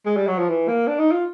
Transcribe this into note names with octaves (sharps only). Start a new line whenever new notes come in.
G#3
G3
F#3
F3
E3
A#3
D4
D#4
F4